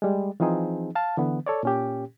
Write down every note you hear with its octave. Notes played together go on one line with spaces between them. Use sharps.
G3 G#3
E3 F3 C4 D#4 G#4
F5 A5
D3 E3 B3
A4 C#5 D5
A#2 C#4 G4